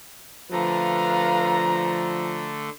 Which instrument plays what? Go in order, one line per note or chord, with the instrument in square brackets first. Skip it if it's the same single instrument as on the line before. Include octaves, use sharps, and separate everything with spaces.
[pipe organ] D3 A3 [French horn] F3 [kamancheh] B4 F5 [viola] A#5